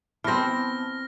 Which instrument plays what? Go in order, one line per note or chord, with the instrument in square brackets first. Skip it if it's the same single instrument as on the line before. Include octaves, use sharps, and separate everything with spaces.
[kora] E3 C4 [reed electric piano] B3 A5 [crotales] F6 A#6